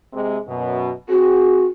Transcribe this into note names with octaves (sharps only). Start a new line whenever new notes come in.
C3 G#3
F#2 B2
C4 F#4 G#4